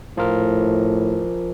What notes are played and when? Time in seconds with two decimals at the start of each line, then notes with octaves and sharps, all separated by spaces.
0.17 A2 F3 F4 A#4